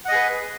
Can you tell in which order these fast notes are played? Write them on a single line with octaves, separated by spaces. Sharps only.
F#5 D#5 G#4 B4